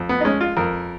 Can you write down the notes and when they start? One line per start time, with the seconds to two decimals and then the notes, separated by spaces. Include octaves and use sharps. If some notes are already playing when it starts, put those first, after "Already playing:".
Already playing: F2
0.09 B3
0.21 D#4
0.25 G#3 C#4
0.41 F4
0.57 F2 A#4